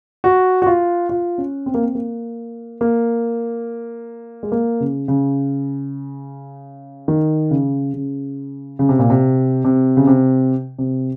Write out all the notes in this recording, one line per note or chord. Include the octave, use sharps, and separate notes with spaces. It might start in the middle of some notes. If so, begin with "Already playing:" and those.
F#4
F#4
F4
F4
C#4
C4
A#3
C4
A#3
A#3
G#3
A#3
C#3
C#3
D#3
C#3
C#3
C#3
C3
A#2
C3
C3
C#3
C3
C3